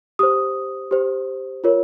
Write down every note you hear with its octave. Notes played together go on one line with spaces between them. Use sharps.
G4 C5 D#6
G4 C5
F4 A#4 C#5